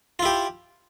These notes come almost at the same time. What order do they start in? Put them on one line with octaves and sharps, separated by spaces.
F4 E4 G4